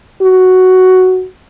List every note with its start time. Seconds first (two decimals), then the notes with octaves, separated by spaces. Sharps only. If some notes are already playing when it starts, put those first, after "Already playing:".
0.22 F#4